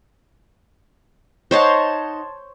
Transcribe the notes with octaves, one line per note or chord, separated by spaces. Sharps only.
D#4 C5 C#5 D#5 F#5 A5